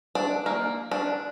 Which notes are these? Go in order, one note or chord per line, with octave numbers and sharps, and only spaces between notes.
D4
A#3
D4